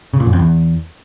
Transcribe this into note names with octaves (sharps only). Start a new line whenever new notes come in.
C#3
A#2
F#2
F2
E2